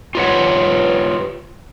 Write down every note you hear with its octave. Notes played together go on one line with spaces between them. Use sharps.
F4 G4 B4 C#5 F#5